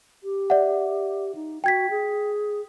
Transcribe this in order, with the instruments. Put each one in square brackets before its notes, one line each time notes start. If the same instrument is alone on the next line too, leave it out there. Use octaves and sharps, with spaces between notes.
[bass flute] G4
[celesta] D5 E5 F#5
[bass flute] D#4
[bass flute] F#4 [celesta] G5 G#6 B6
[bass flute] G#4